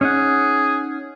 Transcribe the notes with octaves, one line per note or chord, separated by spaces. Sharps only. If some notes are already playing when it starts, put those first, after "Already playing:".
C#4 D#4 G#4 F#5